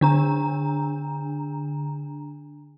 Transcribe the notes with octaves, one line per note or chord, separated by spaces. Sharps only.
D3 D4 A#5